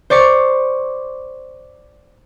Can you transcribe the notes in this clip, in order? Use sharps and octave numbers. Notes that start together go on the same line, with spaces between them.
C5 D5 C#6 C7